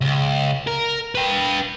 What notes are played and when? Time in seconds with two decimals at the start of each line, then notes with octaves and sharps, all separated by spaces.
0.01 C#2
0.67 A#4
1.15 B4 G5